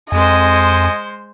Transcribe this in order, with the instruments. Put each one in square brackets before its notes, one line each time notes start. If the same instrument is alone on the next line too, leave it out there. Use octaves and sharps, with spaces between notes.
[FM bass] F2 [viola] G#3 C5 [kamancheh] D#5 G#5